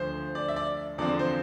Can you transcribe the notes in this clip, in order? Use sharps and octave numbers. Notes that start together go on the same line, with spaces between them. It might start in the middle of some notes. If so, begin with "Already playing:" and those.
Already playing: D2 D3 F3 C5
D5
E5
D5
E2 D3 F3 C4 D5
C5